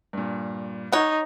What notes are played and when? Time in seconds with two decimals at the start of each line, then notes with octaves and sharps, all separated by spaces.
0.13 G2 A#2
0.93 D#4 C#5 F#5